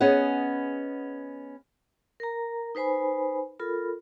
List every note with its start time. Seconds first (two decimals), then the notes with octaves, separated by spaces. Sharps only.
0.01 B3 C#4 G#4 D#5 F#5
2.20 A#4 A#5
2.75 D#4 B4 C5 G#5 B5
3.59 F4 A4 A#4 B5